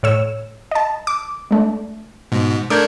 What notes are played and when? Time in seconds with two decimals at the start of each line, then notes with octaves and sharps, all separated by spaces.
0.03 A2 C#5 E6
0.71 D#5 A5
1.07 D6
1.51 G#3 A3 D4
2.32 G#2 B2
2.70 A3 D4 A#4 D6 G6 G#6